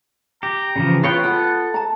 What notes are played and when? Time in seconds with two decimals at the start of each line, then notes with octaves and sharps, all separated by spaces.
0.43 G4 A#5
0.76 C#3 E3 F3
1.04 B3 F4 B4 C#5 G5
1.23 F4 A4 F#5
1.74 A5 A#5